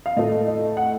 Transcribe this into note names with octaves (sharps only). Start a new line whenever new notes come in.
F5
A2 A3 D#5
D#5
F#5